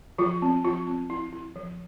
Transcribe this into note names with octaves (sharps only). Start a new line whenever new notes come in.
F3 F4
C4
F3 F4
C4
E4
E4
F3